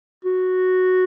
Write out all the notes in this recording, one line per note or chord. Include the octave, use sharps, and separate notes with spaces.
F#4